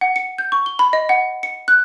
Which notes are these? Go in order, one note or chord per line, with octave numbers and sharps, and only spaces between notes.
F#5
C#7
G6
C#6
G7
B5
D#5
F#5
C#7
F#6